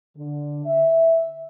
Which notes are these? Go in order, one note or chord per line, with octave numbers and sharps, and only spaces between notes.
D3
E5